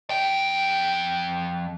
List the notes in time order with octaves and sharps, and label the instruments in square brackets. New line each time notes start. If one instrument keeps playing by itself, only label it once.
[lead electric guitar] F2 G5